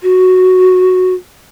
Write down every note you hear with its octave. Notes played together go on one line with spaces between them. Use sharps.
F#4